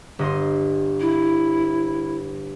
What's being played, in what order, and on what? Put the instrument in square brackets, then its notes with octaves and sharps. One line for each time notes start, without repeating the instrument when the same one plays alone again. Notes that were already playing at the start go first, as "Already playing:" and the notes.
[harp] G1 D#5 C6
[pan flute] E4